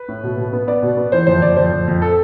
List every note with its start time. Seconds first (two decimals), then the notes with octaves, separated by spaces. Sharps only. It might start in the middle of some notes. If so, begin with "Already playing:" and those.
Already playing: B4
0.08 A2
0.23 B2
0.37 B2
0.53 B3
0.67 B3 D5
0.83 B2
0.97 B3
1.12 E3 C5
1.27 F2 C5
1.42 F2 D5
1.57 F2 C5
1.72 F2
1.88 F2
2.02 A4